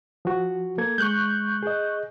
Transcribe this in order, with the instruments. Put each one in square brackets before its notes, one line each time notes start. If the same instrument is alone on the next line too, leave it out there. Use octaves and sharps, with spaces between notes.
[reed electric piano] F3 F#4
A#3 A4 G#6
[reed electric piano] G#3 [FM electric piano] C#6 F#6 G6
[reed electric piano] G#4 D#5